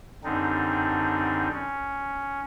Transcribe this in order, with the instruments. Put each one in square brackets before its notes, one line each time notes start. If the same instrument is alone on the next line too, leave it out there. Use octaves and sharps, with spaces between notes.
[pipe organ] F#2 D3 G3 C4 D4 D#4
C#4